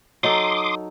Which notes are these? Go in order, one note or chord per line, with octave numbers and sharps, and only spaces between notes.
F#3 D#4 A4 C6 D6 D#6